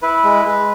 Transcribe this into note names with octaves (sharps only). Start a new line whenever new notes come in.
E4 B4
G#3
G#3